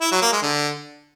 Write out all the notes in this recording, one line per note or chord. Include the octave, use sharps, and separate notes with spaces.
E4
F#3
A#3
G#3
D3